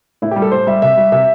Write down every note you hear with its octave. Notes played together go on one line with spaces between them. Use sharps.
A2 E4
G4
G3
A4
A2 C5
G3 E5
C3 E5
G3
C3 E5